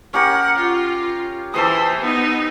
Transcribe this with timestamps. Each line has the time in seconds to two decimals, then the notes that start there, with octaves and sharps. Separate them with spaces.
0.14 C#4 G4 A#4 F#5
0.58 F4
1.54 E3 A4 C5 C6 D#6
2.01 B3 D#4